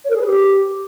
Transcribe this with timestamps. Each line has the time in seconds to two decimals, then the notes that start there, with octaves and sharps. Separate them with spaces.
0.05 C#5
0.10 A#4
0.16 G#4
0.21 B4
0.26 G4